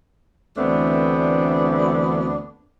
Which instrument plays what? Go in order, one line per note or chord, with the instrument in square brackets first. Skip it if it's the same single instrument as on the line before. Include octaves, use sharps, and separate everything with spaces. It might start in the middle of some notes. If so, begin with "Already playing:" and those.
[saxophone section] D2 E3 A3 B3 C4 D4